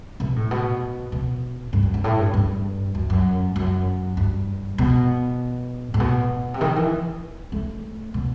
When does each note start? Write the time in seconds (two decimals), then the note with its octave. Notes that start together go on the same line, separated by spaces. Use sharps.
0.20 B2
0.36 A2
0.51 B2
1.12 B2
1.73 G2
1.83 F#2
1.94 G2
2.04 A2
2.19 G2
2.34 G2
2.95 F#2
3.10 F#2
3.56 F#2
4.17 G2
4.78 B2
5.94 A2
6.00 B2
6.54 C3
6.61 D#3
6.76 E3
7.52 A3
8.14 B2